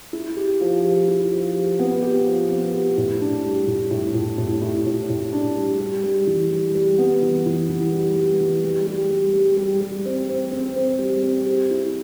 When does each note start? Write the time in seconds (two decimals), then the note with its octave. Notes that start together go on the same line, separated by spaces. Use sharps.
0.13 E4
0.37 G4
0.61 F3
0.84 G4
1.08 E4
1.32 F3
1.55 G4
1.79 B3
2.02 G4
2.27 F3
2.49 B3
2.73 G4
2.97 A2
3.21 D4
3.44 G3
3.67 A2
3.91 A2
4.14 A2
4.38 A2
4.62 A2
4.86 A2
5.09 A2
5.33 D4
5.57 G3
5.80 G3
6.04 G3
6.27 E3
6.51 G3
6.75 G3
6.98 B3
7.22 E3
7.46 E3
7.69 E3
7.92 G3
8.16 G3
8.40 E3
8.64 G3
8.87 G3
9.10 G3
9.34 G3
9.57 G3
9.81 G3
10.05 C4
10.29 C4
10.51 C4
10.76 C4
10.99 G3
11.23 C4
11.46 G4
11.71 E4